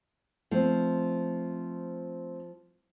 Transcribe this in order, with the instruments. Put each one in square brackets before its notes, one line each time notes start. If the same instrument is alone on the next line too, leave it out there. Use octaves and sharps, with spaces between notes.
[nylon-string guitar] F3 [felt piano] A3 C4